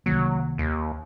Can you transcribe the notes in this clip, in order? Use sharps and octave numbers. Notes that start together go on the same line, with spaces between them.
C2 D#3 F#3 A#3
D#2